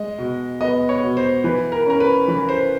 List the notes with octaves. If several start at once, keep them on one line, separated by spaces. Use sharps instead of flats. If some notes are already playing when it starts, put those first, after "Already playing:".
Already playing: G#3 D#5
B2
B3 D#5
C#5
B2
C5
E3 B4
A#4
C#4 A#4
B4
E3 B4
C5